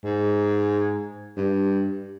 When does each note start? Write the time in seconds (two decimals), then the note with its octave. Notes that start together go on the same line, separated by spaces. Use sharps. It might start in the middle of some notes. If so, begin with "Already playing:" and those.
0.04 G#2
1.36 G2